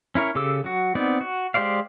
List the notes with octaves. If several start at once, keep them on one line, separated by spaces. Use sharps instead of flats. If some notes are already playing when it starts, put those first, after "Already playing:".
C#4 E4 A#4 C#5
C#3 G4 A4 D6 E6
F#3 F#4
B3 C4 D#4 D5
F#4
G#3 G4 C5 D5 F5